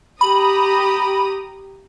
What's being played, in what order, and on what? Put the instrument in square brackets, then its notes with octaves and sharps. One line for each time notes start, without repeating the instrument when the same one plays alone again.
[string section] G4 A#5 D#6 [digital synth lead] B5